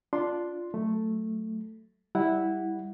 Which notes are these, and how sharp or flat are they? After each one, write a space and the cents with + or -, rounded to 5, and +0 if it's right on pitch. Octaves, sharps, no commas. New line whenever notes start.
D4 +0 F4 +0 C6 +0
F#3 +0 A3 +0
G3 +0 E4 -10 F#5 +0